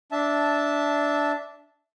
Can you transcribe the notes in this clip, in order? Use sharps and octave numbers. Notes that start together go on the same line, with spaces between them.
D4 E5 A5